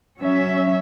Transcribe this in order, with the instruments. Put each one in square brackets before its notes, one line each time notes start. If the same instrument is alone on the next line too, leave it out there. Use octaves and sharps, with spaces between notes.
[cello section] F#3 C#4 E5